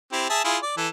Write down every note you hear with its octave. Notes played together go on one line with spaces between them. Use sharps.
C4 E4 G4
G#4 E5 A5
E4 F4 G#4
D5
E3 A4